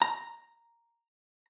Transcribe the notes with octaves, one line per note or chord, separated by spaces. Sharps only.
A#5